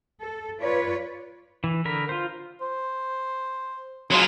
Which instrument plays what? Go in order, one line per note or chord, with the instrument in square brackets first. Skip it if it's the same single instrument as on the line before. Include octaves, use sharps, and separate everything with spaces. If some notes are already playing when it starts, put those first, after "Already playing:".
[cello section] A4
F4 B4 C#5 D5
[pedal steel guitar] E3
D3 A#4 B5
F4 C5
[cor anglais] C5
[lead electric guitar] F#3 F4 [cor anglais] G#3